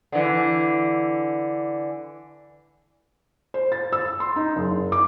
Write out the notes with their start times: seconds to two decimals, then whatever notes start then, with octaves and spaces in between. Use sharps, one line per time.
0.12 D3 E3
3.54 C5
3.72 A6
3.93 E6
4.20 C6
4.36 D#4
4.56 F#1
4.92 D6